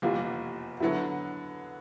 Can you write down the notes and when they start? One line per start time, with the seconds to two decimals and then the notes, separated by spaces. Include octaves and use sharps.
0.02 F1 E2 B2 G3 A#3 F4 G4
0.80 D3 F#3 B3 E4 F#4